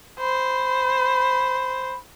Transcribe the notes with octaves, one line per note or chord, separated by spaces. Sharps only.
C5 B5